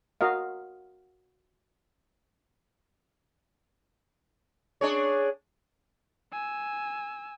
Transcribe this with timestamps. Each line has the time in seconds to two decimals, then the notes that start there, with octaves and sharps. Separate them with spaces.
0.21 F#4 A#4 D#5 F5
4.81 D4 G#4 C#5
6.32 G#5 E6